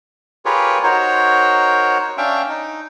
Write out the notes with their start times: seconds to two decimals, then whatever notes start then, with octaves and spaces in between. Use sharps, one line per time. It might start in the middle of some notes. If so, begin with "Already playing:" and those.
0.45 F4 G4 G#4 A#4 B4 C#5
0.83 D#4 F#4 A#4 C5 C#5
2.18 C#4 D4 E5 F5 G5
2.49 D#4